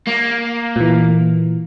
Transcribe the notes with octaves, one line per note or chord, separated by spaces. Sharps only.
A#3
A#2 E3